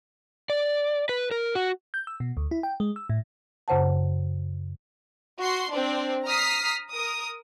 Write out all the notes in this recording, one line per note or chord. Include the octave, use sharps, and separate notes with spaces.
D5
B4
A#4
F#4
G6
E6
B2
D2
E4
G5
G#3
E6
A2
F#2 C#3 C5 F#5 A5
F#4 C6
C4 D4
A#5 D#6 F6 B6 C7
A#4 D#6